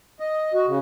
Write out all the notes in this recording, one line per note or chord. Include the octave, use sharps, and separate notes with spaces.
D#5
F#4
C#3